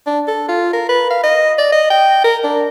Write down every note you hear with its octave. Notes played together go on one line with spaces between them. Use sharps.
D4
A4
F4
A#4
B4
F5
D#5
D5
D#5
G5
A#4
D4